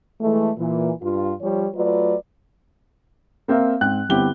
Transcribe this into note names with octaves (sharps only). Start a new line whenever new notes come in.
E3 G#3 A3
A#2 E3
G2 F4
F3 G3 C#5
F#3 A3 F4 B4 D5
A#3 C4 A#4 E5 F5
G#2 C4 G5 F#6
G1 B3 C4 E4 G4 G7